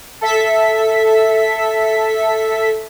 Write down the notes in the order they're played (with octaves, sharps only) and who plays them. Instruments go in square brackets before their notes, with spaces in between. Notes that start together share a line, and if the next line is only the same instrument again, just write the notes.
[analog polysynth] A4 E5 B6